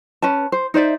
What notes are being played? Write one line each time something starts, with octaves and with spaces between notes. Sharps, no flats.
C#4 B4 A5
C5
D#4 C5 D5 E5